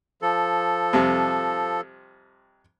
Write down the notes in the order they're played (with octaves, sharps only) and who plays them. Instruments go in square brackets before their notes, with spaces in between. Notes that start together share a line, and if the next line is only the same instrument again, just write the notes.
[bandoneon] F3 A4
[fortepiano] F2 C3 G3